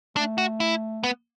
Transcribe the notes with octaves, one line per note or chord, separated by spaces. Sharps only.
A3 D4
F#4
E4
B3